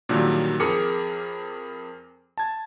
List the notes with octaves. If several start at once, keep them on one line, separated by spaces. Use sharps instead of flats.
A#2 D3 D#3 F#3 G3
F2 G#4 A#4 D6 C#7
A5 G#6